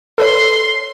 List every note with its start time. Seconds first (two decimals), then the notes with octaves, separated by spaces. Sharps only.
0.18 A4 B4 C#5 C6